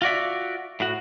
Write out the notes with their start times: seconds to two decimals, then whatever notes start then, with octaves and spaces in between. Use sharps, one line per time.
0.02 F4 F#4 D5 E5
0.80 A2 F#4